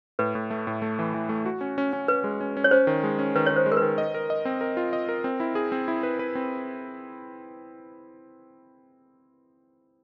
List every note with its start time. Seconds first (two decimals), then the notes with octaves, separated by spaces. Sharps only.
0.19 A2 B4
0.35 A2
0.50 A3
0.67 A2
0.82 A3
0.99 E3
1.14 E3
1.29 A3
1.45 F#4
1.61 C#4
1.78 C#4
1.93 C#4
2.08 C#4 B4
2.24 G#3
2.41 C#4
2.57 C#4
2.64 C#5
2.71 C#4 C5
2.87 D#3
3.03 G#3
3.19 C#4
3.35 D#3 B4
3.46 D#3 C#5
3.56 C5
3.66 G#3
3.72 A#4
3.77 B4
3.82 D#3
3.98 D#5
4.14 A#4
4.30 D#5
4.45 C4
4.61 A#4
4.77 F4
4.93 D#5
5.09 A#4
5.24 C4
5.40 E4
5.55 G#4
5.72 C4
5.88 E4
6.03 B4
6.19 B4
6.35 C4